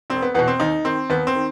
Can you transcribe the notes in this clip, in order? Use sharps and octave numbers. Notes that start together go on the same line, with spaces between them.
E1 C4
B3
E2 B2 B3
C4
D#2 D#4
D#3 C4
D#2 B3
C4
D#3